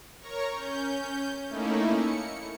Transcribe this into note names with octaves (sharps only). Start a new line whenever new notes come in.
A#4 C#5 A#5 C#6
C#4 G6
A3 A#3 C#4 D#4 E4
C#7